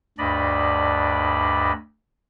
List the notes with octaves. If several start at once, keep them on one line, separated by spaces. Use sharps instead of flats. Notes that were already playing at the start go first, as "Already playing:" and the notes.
D2 G2 D4 D5 D#5 B5